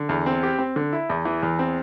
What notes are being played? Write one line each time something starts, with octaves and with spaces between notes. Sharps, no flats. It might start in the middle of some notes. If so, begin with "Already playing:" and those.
Already playing: D3
E2
C4
G4
C4
D3
E4
E2
E3
E2
C4